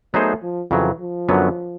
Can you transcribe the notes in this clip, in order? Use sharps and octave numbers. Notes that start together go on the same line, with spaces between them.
F#3 A3 B3 D#4 G#4 C5
F3
F2 C#3 E3 F#3
F3
F#2 D3 F#3 B3